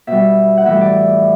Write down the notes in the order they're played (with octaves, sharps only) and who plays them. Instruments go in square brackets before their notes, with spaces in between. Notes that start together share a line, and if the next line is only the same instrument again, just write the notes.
[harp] B2 G3 E5
F#5
A2 E3 G3 E5
D5